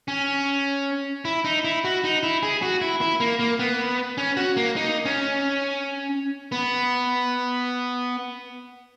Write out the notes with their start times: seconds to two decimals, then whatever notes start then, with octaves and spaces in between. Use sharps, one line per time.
0.08 C#4
1.25 E4
1.45 D#4
1.64 E4
1.84 F#4
2.04 D#4
2.23 E4
2.43 G#4
2.62 F#4
2.81 E4
3.01 E4
3.20 A#3
3.39 A#3
3.59 B3
4.18 C#4
4.37 F#4
4.57 A#3
4.76 D#4
5.05 C#4
6.52 B3